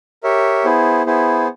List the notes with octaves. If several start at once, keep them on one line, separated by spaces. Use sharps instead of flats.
G4 A#4 C#5 E5
B3 E4 G#4 C5
B3 E4 G#4 C5